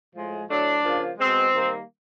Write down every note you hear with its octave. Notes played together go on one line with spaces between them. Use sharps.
A2 F3 G#3
A2 F#3 A3 D4
C#3 F3 A#3
B2 G#3 C4
D#3 G3 A#3